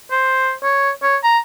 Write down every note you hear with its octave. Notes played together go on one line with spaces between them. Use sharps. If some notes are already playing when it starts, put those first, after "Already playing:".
C5
C#5
C#5
A#5